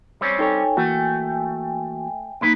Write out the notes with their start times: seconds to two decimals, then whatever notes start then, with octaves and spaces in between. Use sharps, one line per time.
0.21 G3 C4 C#4 C#5
0.39 D#4 A4 C#5 G5 G#5
0.77 E3 A3 A#3 F#4
2.41 B1 A#3 D#4 E4 B4